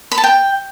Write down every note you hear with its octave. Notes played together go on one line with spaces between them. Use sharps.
B5
A5
G5